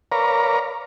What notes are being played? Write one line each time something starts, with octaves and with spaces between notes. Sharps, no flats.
A#4 B4 C#5 D5 F5 A#5